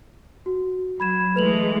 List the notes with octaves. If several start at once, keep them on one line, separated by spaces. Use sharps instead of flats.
F#4
F#3 B5 G#6 E7
E3 G#3 A3 B4 F7 F#7